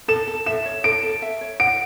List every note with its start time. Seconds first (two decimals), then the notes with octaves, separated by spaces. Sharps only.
0.08 A4 E7
0.28 A4
0.46 E5 E7
0.65 C#5
0.84 A4 D7
1.03 A4
1.22 E5
1.41 C#5
1.60 F#5 D7